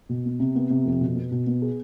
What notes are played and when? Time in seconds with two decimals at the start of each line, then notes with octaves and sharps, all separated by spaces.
0.09 B2
0.25 B3
0.40 C3
0.55 B3
0.70 C3
0.86 F2
1.01 B2
1.15 B3
1.31 B2
1.47 B3
1.62 G#4